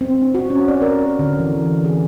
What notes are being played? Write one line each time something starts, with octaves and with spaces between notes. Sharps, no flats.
C4
D4
F#4
C#4
D5
A#4
D3
E3
G#4